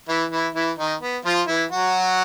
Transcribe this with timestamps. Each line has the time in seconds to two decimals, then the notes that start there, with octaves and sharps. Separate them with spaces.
0.09 E3 E4
0.31 E3 E4
0.55 E3 E4
0.78 D#3 D#4
1.01 B3
1.25 F3 F4
1.48 E3 E4
1.72 F#3 F#4